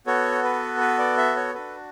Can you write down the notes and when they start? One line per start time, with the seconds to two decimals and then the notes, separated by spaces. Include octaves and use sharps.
0.07 B3 F#4 A4 C#5
0.44 B4
0.81 B4
0.98 D5
1.18 E5
1.36 C#5
1.54 D4 F#4 A4 B4